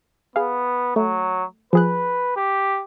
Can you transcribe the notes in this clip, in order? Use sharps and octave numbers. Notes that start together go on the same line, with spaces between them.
B3 G#4 F5
F#3 A3
F3 G#4 B4 F#6
G4